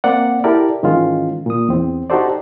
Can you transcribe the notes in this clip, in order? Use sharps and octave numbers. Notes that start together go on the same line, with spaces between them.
A#3 C4 D5 F#5
E4 G4 A4 A#4 D5
G#2 D#3 E3 G#3 C#4 F4
A#2 D#6
E2 C4
D#4 F#4 G4 A4 C5 D5